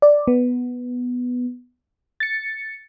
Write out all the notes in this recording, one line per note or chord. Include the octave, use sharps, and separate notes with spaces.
D5
B3
A6 C#7